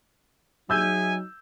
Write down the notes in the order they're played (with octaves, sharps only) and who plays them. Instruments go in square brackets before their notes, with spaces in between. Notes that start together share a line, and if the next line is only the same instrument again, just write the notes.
[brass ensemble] F#3 D#4 [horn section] G#4 E5 G#5 [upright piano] E6 G6